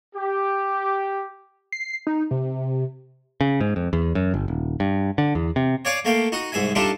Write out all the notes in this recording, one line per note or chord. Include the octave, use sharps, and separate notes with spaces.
G4
C7
D#4
C3
C#3
G#2
F2
E2
F#2
G1
D#1
G2
D3
E2
C3
C#5 D5 F5 G#5 C#6 D6
A3 A#3 F5 G5
D#4 F#4 D#6
C2 G#2 G#4 E5 G#5
G3 D4 D#4 F4 A4 E5